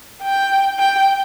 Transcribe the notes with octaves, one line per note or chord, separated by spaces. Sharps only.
G5
G5